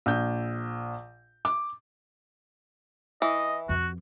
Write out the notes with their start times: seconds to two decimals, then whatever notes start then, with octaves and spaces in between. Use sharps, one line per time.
0.06 A#1 G6
1.45 D6
3.22 E3 D#5
3.69 F2 F#4